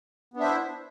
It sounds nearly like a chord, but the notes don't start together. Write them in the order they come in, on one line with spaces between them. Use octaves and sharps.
B3 D4 E5 C5 E4